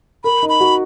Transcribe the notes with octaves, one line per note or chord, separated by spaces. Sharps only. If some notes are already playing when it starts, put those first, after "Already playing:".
A#4 B5
D#4
B5
F#4